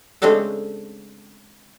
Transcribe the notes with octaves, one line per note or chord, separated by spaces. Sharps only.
C#3 G#3 A3 C4 D4 A4